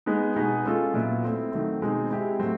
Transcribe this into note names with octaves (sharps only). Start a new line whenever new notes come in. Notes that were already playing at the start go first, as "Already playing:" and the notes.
G#3 B3 D#4
B2 G#3 B3 D#4 G#4
G#3 C#4 F4 A4
A#2 F#3 B3 E4
A3 C4 E4
D#3 F#3 A3 C4
B2 G#3 C4 D#4
G#3 C4 E4 G4
A2 F#3 A3 C4